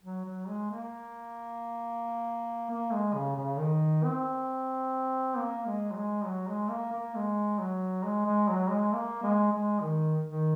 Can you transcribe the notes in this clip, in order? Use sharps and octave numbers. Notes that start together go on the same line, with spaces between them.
F#3
F#3
G#3
A#3
A#3
G#3
C#3
C#3
D#3
C4
A#3
G#3
F#3
G#3
F#3
G#3
A#3
A#3
G#3
F#3
G#3
G#3
F#3
G#3
A#3
G#3
G#3
D#3
D#3